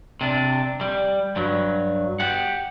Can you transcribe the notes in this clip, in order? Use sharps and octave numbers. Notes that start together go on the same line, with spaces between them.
C3 D4
G3
G2 F#3
G4 F#5